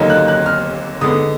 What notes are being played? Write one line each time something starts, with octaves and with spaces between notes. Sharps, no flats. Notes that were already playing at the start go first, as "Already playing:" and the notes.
Already playing: D#2 D3 F#3 A#3 D#4
F#6
F#6
F6
D3 G#3 B3 D#4 D#6